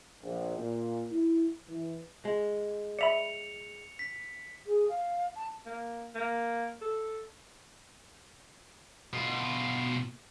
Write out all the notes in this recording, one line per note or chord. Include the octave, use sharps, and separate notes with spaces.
A#1
A#2
E4
E3
G#3
D5 E5 B5 C#7 F7
B6
G#4
F5
A5
A#3
A#3
A4
B2 F4